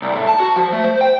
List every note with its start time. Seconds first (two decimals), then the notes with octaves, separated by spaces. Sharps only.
0.02 C2
0.15 A2
0.27 A5
0.40 F#4
0.56 F3
0.73 A3
0.84 C5
1.01 G5